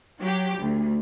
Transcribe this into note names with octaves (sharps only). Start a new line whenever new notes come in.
F#3 G4
D2